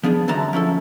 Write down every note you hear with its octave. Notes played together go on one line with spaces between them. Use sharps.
F3 B3 D4 G#4
F#2 D3 E3 A5 A#5
F3 C#4 E4 A4